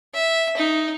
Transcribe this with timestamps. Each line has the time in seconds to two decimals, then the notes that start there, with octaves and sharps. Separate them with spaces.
0.14 E5
0.57 D#4